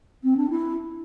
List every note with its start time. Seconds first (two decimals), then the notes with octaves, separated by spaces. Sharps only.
0.24 C4
0.37 D4
0.50 E4